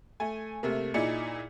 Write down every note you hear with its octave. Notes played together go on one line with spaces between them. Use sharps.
A3 G#5
C3 A3 A#3
A#2 D#4 E4 G#4 D5 C#7